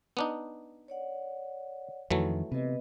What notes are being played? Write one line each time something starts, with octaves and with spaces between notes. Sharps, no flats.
B3 D4 D#4
C#5 D5 F#5
F2 D#3 E3 F#3 A3
C3 B3 B4 D#5